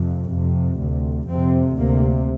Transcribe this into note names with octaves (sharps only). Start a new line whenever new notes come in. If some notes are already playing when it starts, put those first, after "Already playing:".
Already playing: F2 C3
F2 C3
D2 C3
F2 C3 C4
D2 C3 A#3